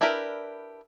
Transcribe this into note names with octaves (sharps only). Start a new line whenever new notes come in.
D4 E4 G4 A#4 B4